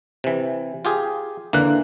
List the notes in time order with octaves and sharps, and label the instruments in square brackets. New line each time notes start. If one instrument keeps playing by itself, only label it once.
[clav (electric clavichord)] C3 E3
F4 G4 G#4
[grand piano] D3 F#6 [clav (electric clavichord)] E3 A#3